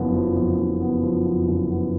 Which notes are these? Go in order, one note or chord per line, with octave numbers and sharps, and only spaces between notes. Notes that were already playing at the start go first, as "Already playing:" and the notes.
Already playing: F#1 F2 F3 B3
F3
F2
F#1
B3
F3
F2
F#1
B3